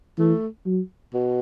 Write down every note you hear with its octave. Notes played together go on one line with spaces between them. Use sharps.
E3 A3
F#3
B2